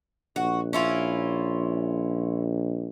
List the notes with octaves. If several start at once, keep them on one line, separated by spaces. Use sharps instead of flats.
A#1 F#4
C#4 E4 F4